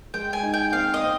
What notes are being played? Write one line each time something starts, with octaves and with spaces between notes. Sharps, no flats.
G#3 G5
G#5
D#4
G5
C4 F5
D#5
C4